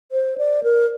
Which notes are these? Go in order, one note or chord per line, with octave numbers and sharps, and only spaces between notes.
C5
D5
A#4